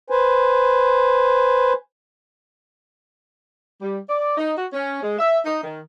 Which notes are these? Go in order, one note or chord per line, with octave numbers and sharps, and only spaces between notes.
B4 C5 G#5
G3
D5
D#4
F#4
C#4
G#3
E5
D#4
D#3